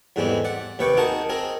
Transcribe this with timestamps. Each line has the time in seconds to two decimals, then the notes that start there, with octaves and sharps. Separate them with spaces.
0.16 E2 G#2 D3 G3 G#3 C4
0.44 D5 F#5
0.79 D#2 C3 B4 G5 C#6 D6
0.97 D#4 F#4 G#4 A#4 F#5 A5
1.29 C4 G#4 A#4 D#5